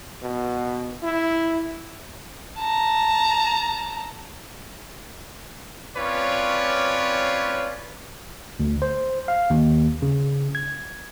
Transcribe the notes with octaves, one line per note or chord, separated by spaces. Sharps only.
B2
E4
A5 A#5
C4 C#4 F4 B4 C#5 D5
D2
C5
F5
D#2
C#3
G#6